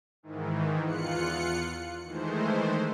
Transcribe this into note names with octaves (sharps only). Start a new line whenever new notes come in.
G#2 D#3 E3
E2 F4 F#6 C#7
D#3 E3 G#3 A3 C5